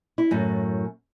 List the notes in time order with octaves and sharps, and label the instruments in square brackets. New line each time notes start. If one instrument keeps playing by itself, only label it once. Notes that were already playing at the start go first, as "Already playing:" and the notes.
[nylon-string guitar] E4
F#2 A2